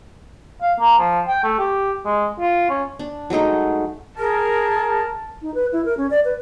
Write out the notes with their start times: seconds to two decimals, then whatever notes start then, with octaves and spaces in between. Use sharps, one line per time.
0.62 F5
0.80 A#3
0.98 F3
1.28 G5
1.44 A3
1.59 G4
2.05 G#3
2.40 F4
2.70 C#4
2.99 D4
3.30 F#3 G#3 A3 D#4
4.19 G#4 A#4 A5
5.42 D#4
5.54 B4
5.72 E4
5.85 A#4
5.97 C#4
6.10 D5
6.25 B4